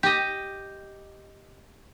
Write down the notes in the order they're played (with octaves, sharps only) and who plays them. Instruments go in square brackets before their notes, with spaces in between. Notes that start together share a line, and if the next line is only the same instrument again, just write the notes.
[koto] G4 D#5